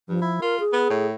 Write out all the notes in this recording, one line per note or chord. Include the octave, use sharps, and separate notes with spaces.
G2 F3
E4
F4 A#4
G#4
B3
A2